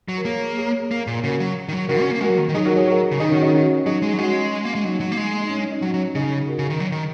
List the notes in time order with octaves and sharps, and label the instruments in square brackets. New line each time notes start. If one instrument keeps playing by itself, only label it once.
[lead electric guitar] F#3
[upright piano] A#4
[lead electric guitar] A#3 [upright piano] G#4 C#5
[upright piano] G#4 C#5
[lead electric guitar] A#3
A#2
[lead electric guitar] C#3 [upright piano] F#4 A#4
[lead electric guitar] F#3
D#3
F#3
[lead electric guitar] C#3 [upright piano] F#4 A#4
[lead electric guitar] C#4
A#3
[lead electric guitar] G#3 [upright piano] F#4 A#4
[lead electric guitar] F#3
D#3
D#3
[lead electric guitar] F#3 [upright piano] D#4 G#4
[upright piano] F#4 A#4
G#4 C#5
F#4 A#4
[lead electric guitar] C#3
[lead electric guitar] D#3 [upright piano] D#4 G#4
[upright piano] C#4 F#4
D#4
C#4 F#4
[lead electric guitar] F#3 [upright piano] D#4 G#4
[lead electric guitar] G#3
F#3
[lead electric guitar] G#3 [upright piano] C#4 F#4
[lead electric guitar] A#3
G#3
[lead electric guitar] F#3 [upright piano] D#4
[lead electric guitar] F#3
A#3
G#3
[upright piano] D#4
C#4
C#4
D#4
[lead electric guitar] F#3 [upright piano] C#4 F#4
[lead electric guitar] F#3
[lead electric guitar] C#3 [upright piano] D#4 G#4
[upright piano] F#4 A#4
[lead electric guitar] C#3
D#3
F#3
D#3